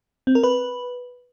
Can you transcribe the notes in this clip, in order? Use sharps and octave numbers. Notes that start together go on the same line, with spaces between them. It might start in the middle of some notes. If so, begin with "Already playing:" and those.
C4
A#4
B4